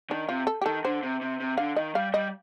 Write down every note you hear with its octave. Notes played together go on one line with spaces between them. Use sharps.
D#3 D4
C3 F4
A4
G4
D#3 A4
D3 C5
C3
C3
C3
D3 F5
D#3 D#5
G3 F5
G3 D#5